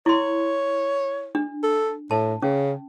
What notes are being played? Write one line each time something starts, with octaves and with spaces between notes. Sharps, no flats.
E4 C#5 C6
D4
A4
A2 A5
C#3 C#4